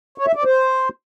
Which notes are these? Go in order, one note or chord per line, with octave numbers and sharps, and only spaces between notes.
C#5
E5
D5
C5